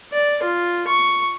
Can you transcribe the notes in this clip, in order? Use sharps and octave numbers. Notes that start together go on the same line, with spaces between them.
D5
F4
C#6